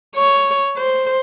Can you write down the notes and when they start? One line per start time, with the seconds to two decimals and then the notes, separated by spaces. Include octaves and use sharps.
0.16 C#5
0.78 C5